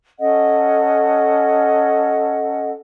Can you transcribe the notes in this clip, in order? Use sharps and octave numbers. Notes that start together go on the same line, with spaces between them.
C#4 A4 D#5 F#5